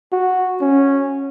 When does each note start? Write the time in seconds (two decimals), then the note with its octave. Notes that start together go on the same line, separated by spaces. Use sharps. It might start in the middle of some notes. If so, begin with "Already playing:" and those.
0.12 F#4
0.61 C#4